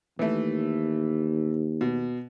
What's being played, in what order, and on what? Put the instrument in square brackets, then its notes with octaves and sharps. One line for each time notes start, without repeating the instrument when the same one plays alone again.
[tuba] D#2 [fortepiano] E3 A3
[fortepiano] B2